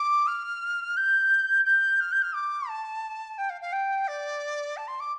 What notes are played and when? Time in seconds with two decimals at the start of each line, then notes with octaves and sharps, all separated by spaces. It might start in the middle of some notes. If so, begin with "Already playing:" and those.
Already playing: D6
0.27 F6
0.97 G6
1.65 G6
2.00 F6
2.12 G6
2.22 F6
2.34 D6
2.68 A5
3.38 G5
3.50 F5
3.61 F5
3.72 G5
4.07 D5
4.77 A5
4.87 C6
5.00 D6